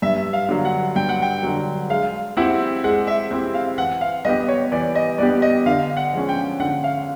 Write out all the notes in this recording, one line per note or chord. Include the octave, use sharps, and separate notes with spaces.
G2 E5
F5
D3 F#3
F#5
G2 G5
F#5
G5
D3 F#3
G#3 F5
C4 E4 G4 F#5
G#3 F#5
E5
C4 E4 G4
F5
E3 F#5
F5
G3 B3 D4 G4 D#5
C#5
E3 D5
D#5
G3 B3 D4 G4 D5
D#5
D3 F5
F#5
F3 G#3 C#4
G5
D3 F#5
F5